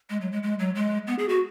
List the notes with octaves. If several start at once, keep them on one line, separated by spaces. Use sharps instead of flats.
G#3
F#3
G#3
G#3
F#3
G#3
B3
G#4
F#4